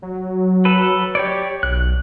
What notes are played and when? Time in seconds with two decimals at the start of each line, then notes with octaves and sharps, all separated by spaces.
0.02 F#3
0.65 A4 B4
1.15 G4 C#5 D5
1.63 B1 F#6